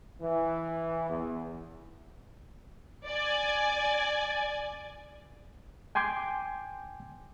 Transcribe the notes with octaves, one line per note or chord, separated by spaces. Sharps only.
E3
E2
D5 G#5
G5 G#5 C6 D6 G6